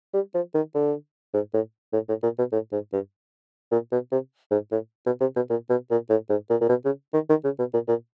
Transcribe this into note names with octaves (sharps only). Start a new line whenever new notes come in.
G3
F3
D#3
D3
G#2
A2
A2
A2
A#2
B2
A2
G#2
G2
A#2
B2
C3
G#2
A2
B2
C3
B2
A#2
B2
A#2
A2
G#2
A#2
A#2
B2
C#3
D#3
D#3
C#3
B2
A#2
A#2